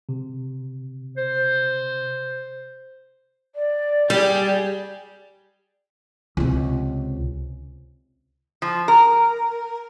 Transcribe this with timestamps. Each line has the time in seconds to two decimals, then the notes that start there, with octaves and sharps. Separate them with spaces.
0.09 C3
1.17 C5
3.55 D5
4.10 G3 G4 G#4
6.37 C#2 C3
8.62 F3
8.88 A#4